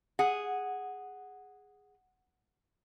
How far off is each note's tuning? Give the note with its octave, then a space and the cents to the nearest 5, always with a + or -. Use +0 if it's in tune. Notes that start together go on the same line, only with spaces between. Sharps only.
G#4 -5 F#5 +0